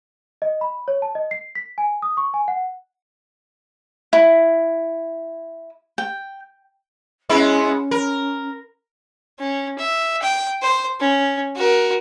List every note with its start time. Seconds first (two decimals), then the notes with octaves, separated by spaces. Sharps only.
0.42 D#5
0.61 B5
0.88 C#5
1.02 A5
1.15 D#5
1.31 C7
1.55 B6
1.78 G#5
2.02 D#6
2.17 C#6
2.34 G#5
2.48 F#5
4.13 E4
5.98 G5
7.29 G#3 B3 C#4 E4
7.62 C#4
7.91 A#4
9.39 C#4
9.78 E5
10.22 G5
10.62 C5
11.00 C#4
11.55 F#4 A#4